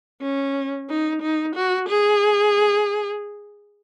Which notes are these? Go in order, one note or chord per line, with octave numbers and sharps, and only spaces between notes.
C#4
D#4
D#4
F#4
G#4